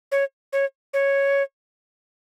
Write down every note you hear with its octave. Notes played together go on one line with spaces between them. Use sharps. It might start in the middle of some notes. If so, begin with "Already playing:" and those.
C#5
C#5
C#5